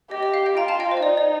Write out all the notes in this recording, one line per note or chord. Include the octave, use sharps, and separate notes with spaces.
G4 D#5
D#5
F5
D#5 G5
F4 G5 A#5
F5 A5
D#5 G5
C5
D#5
D#4 D5
D5